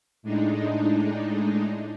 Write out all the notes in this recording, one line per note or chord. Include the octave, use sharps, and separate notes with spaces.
A2 G#3 D4 D#4